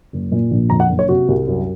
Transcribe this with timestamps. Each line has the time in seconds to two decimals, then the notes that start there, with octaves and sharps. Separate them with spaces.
0.13 F#1
0.32 A#2
0.51 A#1
0.70 F2 A#5
0.80 F#5
0.90 F#1
0.99 C#5
1.09 C3 F#4
1.28 C2
1.47 F#2